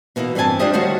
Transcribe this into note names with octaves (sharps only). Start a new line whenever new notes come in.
B2 E3 A#3 D#4 E4
G2 E3 C4 B4 G#5 A5
G3 D4 F4 G4 C5 D#5
D2 D#3 G3 F#4 C5 C#5